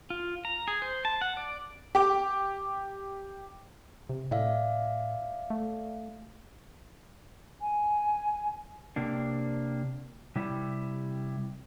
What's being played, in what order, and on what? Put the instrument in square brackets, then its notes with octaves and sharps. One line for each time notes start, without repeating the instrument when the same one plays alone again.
[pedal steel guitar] F4
A#5
G#4
C5
A5
F#5
D5
[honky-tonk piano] G4 D6
[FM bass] C3
[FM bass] A2 [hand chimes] D5 E5 F5
[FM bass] A3
[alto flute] G#5
[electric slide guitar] C3 A#3 D4
C3 G3 E4